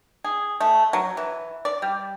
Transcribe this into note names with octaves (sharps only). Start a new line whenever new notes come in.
G#4
A3
F#3
E3
D5
G3